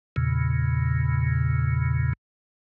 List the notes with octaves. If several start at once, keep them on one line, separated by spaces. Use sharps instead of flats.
E2 A#2 C#3